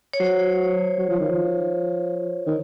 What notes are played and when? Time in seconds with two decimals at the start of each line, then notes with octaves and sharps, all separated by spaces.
0.13 C#5
0.20 F#3 C5
0.98 F#3
1.09 F3
1.20 D#3
1.31 F3
2.46 D#3